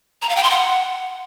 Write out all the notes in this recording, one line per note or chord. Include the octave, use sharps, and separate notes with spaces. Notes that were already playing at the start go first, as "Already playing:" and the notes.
A#5
F5
G5
C6
F#5